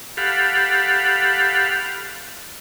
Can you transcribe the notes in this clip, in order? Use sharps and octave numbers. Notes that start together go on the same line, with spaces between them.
G4 A4 F5 F#5 B5